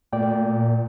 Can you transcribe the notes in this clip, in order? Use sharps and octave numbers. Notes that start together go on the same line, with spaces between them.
A#2 A3 D5 G5